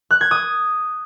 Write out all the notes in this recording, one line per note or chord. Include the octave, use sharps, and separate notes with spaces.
F#6
G#6
D#6